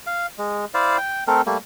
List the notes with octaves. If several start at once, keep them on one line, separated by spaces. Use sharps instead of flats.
F5
G#3
E4 C5 D5 F5
G5
A3 C4 A4 A#4
G3 A3 A#3